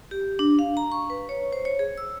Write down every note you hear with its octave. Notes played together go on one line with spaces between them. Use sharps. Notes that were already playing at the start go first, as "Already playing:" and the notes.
G4
D4
F5
A#5
C#6
B4
C#5
C5
C#5
G#4
E6